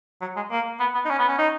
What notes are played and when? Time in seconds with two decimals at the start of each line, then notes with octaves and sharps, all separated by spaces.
0.21 F#3
0.36 G#3
0.51 A#3
0.80 B3
0.95 B3
1.05 D#4
1.10 C#4
1.19 B3
1.29 C#4
1.39 D#4